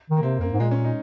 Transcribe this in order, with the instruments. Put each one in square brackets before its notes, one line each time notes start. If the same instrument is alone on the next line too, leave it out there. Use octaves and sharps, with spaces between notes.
[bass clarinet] D#3
[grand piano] A#3
[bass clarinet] C3 [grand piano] C4
[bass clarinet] F2 [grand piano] A#3
[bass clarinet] F#2
G#2
[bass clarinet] A#2 [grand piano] G#3
[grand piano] C#4
D#4